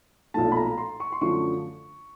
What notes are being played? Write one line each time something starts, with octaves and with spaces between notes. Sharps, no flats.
B1 A#2 F3 A3 A5
B5
A#5
C6
C#6
C6
F#2 D3 F3 A3 C#6